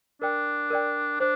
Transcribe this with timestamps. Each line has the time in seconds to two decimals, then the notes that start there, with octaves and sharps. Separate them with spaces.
0.22 D4 A#4 D5 G5
0.70 A#4 D5 G5
1.20 D4 C5